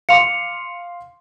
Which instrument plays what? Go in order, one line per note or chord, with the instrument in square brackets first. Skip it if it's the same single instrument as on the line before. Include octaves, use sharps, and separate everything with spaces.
[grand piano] F5 C6 D6 [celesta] C#7 F7